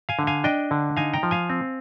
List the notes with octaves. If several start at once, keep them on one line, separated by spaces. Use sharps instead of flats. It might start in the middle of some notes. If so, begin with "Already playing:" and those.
F5 G#5
D3
F5 G#5
D4 D#5 G5
D3
D#4 F5 G#5
G5 A#5
F3
F5 G#5
C4